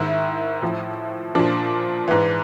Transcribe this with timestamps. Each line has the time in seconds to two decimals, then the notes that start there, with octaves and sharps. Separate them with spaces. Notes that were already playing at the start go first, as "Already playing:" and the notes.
Already playing: G#2 D#3 E4
0.62 A2 F3
1.35 A#2 F3 D4
2.08 G#2 E3